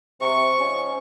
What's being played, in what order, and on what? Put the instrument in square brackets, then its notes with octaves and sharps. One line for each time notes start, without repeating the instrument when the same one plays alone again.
[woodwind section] C3 [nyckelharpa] C#6
[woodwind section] G#2 F3 C#4